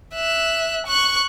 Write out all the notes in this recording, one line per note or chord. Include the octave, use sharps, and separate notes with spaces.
E5 F#6
C#6 F#6